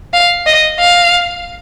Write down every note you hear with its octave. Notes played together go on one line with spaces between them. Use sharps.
F5
D#5
F5